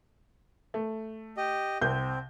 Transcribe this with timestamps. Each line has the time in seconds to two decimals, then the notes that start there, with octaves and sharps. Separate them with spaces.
0.74 A3
1.37 G4 D#5
1.82 C2 C4 G6